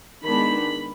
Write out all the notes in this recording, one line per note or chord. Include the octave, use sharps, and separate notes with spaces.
D#3 G#3 B3 D4 B5